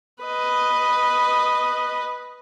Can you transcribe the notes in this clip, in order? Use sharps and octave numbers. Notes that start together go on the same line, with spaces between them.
B4 D#5